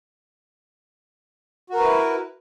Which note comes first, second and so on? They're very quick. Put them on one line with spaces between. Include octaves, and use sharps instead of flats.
F#4 A#4 B4 E4